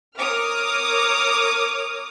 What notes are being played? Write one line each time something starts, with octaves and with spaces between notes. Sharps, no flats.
A#4 C#5 D6 D#6 F6